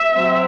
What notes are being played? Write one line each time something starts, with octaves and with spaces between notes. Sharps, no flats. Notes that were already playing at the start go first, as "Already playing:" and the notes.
Already playing: E5
F#3 C4